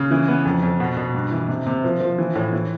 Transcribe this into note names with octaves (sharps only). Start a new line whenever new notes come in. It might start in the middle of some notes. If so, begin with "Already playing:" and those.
Already playing: C#3
E3
B3
F2
F2
B2
B2
G2
E3
C3
C3
F3
F3
E3
A2
E3